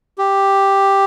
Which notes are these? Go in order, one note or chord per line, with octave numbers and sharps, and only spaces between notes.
G4